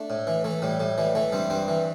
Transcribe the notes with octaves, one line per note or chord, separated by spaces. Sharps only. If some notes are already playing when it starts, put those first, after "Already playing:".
Already playing: A3 D4
A2
E3
E3 A3
A2 G3
A2 G3
E3 G3
E3 A3
G2 G3 C4
G2 G3 C4
E3